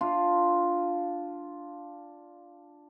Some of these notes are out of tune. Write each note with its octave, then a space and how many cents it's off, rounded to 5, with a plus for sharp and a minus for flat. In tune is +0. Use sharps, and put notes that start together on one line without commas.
D4 +0 F4 +0